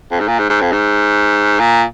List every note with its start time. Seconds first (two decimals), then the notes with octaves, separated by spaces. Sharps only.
0.12 F2
0.20 G#2
0.28 A#2
0.39 G#2
0.50 G#2
0.61 F2
0.72 G#2
1.60 A#2